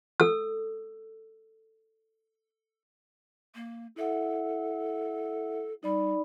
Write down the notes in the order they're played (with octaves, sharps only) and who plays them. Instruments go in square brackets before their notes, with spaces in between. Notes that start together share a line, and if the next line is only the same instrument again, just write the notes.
[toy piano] A4 E6
[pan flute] A#3
[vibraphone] E4 E5 F#5 [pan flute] A4
[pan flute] G3 [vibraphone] D#4 D5 B5